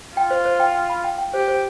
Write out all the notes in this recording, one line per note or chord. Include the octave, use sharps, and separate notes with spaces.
F4 G5
C5
C5
G5
G5
B5
G5
G5
G4 C5
C5